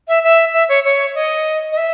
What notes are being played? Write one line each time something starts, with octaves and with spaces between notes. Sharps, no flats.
E5
E5
E5
C#5
C#5
D#5
D#5
E5